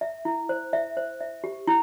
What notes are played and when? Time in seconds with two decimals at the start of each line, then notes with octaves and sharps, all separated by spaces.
0.01 E5
0.25 E4
0.49 C5
0.73 E5
0.97 C5
1.21 E5
1.44 G4
1.68 E4